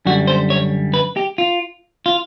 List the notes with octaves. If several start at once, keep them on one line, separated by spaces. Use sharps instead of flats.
F#2 D3 G3 F#4
C5
C#5
B4
G4
F4
F4